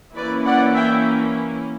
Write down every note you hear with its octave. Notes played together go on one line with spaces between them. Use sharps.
E3 A#3 C#4 E4 B4 D5
D5 F#5
E5 G5